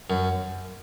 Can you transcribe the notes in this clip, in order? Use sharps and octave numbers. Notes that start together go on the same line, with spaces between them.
F#2